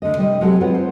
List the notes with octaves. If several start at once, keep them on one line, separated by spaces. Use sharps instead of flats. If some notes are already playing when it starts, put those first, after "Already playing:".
D2 D3 D#3 D#5
C3 G3 D#5
F#3 G#3 C4 F#4 G4 A4
C4 F4 G#4 B4 C#5 F#5
C5